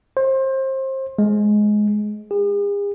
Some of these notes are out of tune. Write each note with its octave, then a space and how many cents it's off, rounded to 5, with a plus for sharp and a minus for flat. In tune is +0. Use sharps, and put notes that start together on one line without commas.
C5 +25
G#3 +15
G#4 -45